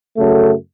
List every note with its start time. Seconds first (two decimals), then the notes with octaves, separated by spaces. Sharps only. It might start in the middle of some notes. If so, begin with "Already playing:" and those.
0.18 F#2 C#3 F#3 A3 A4